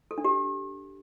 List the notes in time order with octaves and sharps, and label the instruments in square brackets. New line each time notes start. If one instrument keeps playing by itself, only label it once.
[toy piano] A4
D4
G4